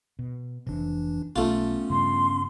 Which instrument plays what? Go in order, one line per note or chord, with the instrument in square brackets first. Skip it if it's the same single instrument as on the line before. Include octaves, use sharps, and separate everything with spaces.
[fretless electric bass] B2
[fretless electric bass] F1 C3 [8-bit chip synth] E3 D4
[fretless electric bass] B1 [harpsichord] A3 F4 [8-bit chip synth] B3 C#4
[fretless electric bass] G2 C#3 G3 [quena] C6